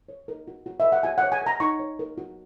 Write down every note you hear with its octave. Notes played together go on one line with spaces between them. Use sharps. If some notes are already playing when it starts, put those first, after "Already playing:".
C#5
A#4
F#4
F#4
B4 E5
F#5
F#4 G#5
F#5
C#5
G#5
A#4 A#5
D#4 C#6
C#5
A#4
F#4